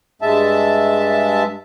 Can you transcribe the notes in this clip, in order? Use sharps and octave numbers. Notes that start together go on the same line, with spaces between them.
G2 G#3 E5 A5